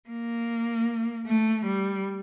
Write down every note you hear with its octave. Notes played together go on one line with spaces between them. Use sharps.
A#3
A3
G3